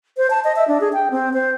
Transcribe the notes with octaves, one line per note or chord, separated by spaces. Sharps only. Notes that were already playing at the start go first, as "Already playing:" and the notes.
C5
A5
D#5
E5
D4
G#4
G5
C4
C5